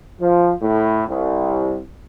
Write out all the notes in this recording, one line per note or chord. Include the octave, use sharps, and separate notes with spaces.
F3
A2
C2